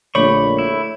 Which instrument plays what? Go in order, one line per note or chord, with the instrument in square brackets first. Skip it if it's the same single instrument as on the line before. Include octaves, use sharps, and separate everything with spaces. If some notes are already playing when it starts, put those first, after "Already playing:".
[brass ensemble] A#1 [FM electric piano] D3 A3 D5 [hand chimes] C#5 [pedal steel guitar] B5 C#6
[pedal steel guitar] E4